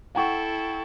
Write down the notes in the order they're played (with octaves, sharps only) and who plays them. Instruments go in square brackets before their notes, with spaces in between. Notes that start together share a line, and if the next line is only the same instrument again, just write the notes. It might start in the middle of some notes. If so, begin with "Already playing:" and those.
[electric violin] E4 A4 [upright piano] F#5 G5 C#6